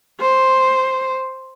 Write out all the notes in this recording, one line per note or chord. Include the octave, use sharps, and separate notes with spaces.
C5